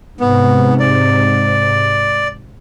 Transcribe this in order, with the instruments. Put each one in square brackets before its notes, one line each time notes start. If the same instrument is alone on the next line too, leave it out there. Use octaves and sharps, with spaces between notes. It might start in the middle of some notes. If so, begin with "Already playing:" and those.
[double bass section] G#2 C3 [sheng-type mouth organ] B3
[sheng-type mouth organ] D5